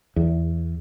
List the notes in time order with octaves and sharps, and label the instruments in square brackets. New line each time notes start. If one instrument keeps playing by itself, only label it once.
[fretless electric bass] E2